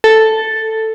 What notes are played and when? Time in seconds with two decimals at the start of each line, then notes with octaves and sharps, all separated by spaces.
0.04 A4